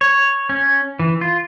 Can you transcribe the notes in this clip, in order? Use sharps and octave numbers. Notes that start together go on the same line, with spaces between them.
C#5
C#4
E3
F4